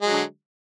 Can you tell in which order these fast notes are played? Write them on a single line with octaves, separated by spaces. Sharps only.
G#3 F#3 D3